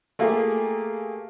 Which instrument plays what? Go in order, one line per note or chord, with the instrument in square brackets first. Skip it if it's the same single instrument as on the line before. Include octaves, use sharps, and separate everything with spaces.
[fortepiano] A3 A#3 F4 G4 G#4